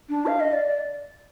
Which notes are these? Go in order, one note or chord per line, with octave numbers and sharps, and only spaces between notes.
D4
F5
D#5
D5